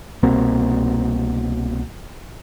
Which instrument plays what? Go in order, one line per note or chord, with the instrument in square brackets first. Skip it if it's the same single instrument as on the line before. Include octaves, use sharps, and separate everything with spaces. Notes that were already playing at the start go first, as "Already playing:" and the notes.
[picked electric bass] C2 B2 A#3 C4